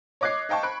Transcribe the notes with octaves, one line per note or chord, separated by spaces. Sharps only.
C#5 D#5 D6 F#6 G#6 C7
D#5 F5 G5 A5 C#6
B5 C#6 F#6 D7